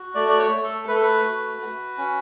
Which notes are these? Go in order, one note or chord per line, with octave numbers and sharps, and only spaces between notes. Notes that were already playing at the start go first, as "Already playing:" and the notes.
Already playing: F#4
A3 D5
D5
C#5
A3
A4
A3 B4
A4
B4
F#4
F#4
C#4